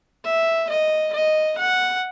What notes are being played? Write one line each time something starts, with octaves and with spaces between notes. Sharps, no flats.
E5
D#5
D#5
F#5